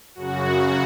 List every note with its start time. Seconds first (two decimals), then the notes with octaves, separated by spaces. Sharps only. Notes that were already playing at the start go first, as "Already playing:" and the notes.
0.15 F#2 C#3 F#4